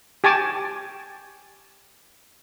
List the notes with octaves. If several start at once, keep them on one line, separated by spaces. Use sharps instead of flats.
G4 G#5 A5 C#6 D6